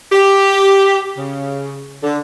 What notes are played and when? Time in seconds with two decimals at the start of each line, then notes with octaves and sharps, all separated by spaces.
0.12 G4
1.18 C#3
2.03 D3